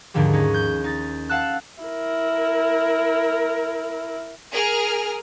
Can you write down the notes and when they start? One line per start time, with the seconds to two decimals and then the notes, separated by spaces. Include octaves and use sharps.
0.14 D#2 G#2 D3 F3 G3
0.33 C#4 D#4
0.54 G6
0.84 D#4 A6
1.29 F5 F#5 A5 E6 F#6
1.82 E4 A#4
4.53 G#4 A#4 F6